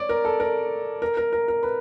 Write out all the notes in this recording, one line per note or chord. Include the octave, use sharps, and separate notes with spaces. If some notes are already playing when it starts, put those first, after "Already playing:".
Already playing: C#5 D5
A#4
A4
A#4
A#4
A#4
A#4
A#4
B4